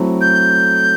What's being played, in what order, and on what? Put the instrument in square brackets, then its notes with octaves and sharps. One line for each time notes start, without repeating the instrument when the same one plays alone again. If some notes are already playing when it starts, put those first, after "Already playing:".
Already playing: [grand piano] F#3 A3 C4 E4 A4
[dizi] G6